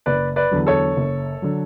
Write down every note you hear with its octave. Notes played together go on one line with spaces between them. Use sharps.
F#1 B4 D5
B4 D5
E2 D3 F#3
A4 C#5
F#1
D3 F#3